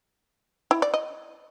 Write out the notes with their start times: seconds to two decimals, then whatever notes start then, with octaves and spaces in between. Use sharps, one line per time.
0.71 E4
0.82 D5
0.94 D#5